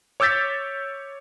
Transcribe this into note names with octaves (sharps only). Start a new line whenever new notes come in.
C#5 D6 E6 G6 A6 B6